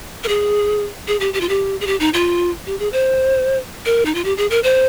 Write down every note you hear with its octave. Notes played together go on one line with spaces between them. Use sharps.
A#4
G#4
G#4
G4
G4
F4
G4
G#4
G4
D#4
F4
G4
G#4
C5
A#4
D#4
F4
G4
G#4
A#4
C5